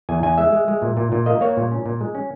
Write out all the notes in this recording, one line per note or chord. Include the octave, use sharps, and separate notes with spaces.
E2 G#5
E2 G#5
G#3 E5
G#3
G#3
A#2
A#2
A#2
A#3 D#5
A#3 C#5
A#2
C#4
A#2
G#3
C#4